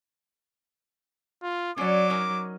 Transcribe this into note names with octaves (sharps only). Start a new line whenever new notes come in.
F4
F#3 C#4 D5 D6
C#4 D#4 A#4